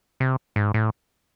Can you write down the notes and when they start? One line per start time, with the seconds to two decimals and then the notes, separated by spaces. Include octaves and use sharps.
0.20 C3
0.56 G#2
0.74 A2